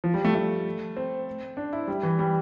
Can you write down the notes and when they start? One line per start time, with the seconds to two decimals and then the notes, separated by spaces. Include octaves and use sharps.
0.04 F3
0.14 G3
0.25 A3
0.35 A3
0.97 C4
1.57 D4
1.73 E4
1.88 G3
2.03 E3
2.19 G3